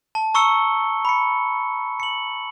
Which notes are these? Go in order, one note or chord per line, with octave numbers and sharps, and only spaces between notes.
A5
A#5 C#6 E6 C#7 G7
B5 C#7
C#7 F#7